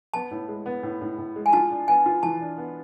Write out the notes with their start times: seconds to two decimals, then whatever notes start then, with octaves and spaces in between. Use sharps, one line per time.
0.14 B3 A5
0.31 A2
0.48 G#3
0.66 B3
0.83 A2
1.01 A2
1.18 A2
1.36 G#3
1.46 G#5
1.53 F4 A5
1.71 D4
1.88 B3 G#5
2.06 F4
2.23 E3 A5
2.41 D4
2.58 B3